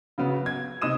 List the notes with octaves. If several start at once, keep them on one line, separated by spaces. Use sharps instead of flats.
C#3 F#3 B3
G#6
C3 D#4 D#6 E7